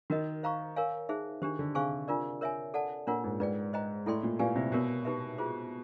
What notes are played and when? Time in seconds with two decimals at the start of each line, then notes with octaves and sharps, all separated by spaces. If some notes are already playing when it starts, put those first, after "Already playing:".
0.10 D#3 F#4 A#4 D#5
0.43 C5 F5 A#5 C#6
0.76 A#4 C#5 F5 G#5
1.09 D#4 G#4 C5 E5
1.42 D#3 D4 G4 C5
1.59 D3
1.75 C3 G#4 C5 F5 G#5 C#6
2.08 D4 F4 A#4 D5
2.41 A#4 C#5 E5 G#5
2.74 A4 D5 F#5 A5
3.07 A#2 D4 F4 A#4 C#5 F#5
3.24 G#2
3.40 G#2 B4 D5 G5
3.73 C5 D#5 G5 A#5
4.06 A2 E4 A4 D5 G5 C6
4.23 A#2
4.39 A#2 G4 B4 D5 F5 G#5
4.56 C3
4.72 B2 F#4 A#4 C#5
5.05 D#4 G4 B4 E5
5.38 F4 G#4 C5